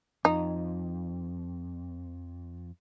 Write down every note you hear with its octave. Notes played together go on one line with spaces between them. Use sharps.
F2 D#4